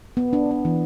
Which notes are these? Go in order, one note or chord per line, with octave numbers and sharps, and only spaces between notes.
B3
D4
D4
E3